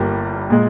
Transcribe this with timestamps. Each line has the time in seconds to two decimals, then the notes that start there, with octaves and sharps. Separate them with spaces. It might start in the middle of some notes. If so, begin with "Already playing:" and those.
Already playing: G1 G2 G3 A#3
0.50 A#2 G#3